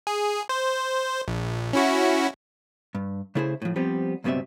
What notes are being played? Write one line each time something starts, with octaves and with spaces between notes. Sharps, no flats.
G#4
C5
A#1
C#4 E4 F#4
G2
C#3 A3 E4 G#4 A#4 C5
A2 F3
F3 G3 B3 C4 G4
C#2 G2 B2 G3 C4 E5